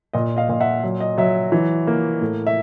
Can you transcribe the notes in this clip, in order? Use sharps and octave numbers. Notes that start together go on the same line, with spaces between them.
A#2 D#5
D#5 F5
A#2
E5 F#5
F#3
D#5
F#3 E5
E3
A#3
A2
E5